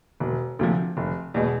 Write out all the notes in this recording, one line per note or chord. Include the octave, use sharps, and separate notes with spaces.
E1
D2 C3 F3
F1
E2 B2 G#3